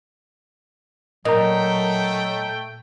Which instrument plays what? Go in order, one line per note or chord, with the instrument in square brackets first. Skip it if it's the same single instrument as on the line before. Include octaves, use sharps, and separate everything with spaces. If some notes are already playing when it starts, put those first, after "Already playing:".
[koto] A#2 [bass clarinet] F#3 [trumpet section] A3 G5 [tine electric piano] D#5 A#5